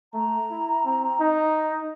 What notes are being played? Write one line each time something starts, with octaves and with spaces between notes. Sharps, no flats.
A3 A#5
E4
C4
D#4